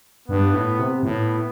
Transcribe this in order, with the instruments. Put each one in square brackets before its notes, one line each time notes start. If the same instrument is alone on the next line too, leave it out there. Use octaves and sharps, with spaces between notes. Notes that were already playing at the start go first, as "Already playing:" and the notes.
[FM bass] G2 [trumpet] B3
[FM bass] A2
C3
[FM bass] A2 [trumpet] B3